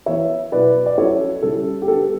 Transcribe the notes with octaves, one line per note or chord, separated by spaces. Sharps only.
E3 B3 E4 C#5 E5
B2 F#3 B3 E4 B4 D5
D5
F#3 C#4 E4 A4 C#5
C#3 G3 C#4 E4 A4
G4
D3 G3 B3 A4